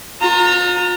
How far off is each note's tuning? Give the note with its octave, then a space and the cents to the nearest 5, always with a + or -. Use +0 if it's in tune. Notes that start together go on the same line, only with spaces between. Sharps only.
F4 +40 A#5 -20